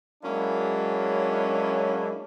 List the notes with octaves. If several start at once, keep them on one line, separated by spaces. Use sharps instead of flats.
F#3 G#3 A#3 C#4 D4 E4